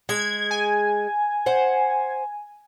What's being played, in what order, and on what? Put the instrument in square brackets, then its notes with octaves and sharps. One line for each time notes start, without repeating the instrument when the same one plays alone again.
[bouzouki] G#3 [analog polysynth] G#6
[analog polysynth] G#5
[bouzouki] C5 F#5